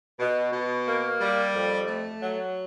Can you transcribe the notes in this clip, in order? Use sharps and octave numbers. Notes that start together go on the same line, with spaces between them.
B2
B2
A#3
G3
F2
A3
F#3